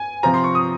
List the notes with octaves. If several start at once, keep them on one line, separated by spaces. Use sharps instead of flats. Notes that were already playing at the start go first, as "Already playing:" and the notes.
Already playing: G#5
C3 F3 C4 F4 A#5
C6
C#6
D#6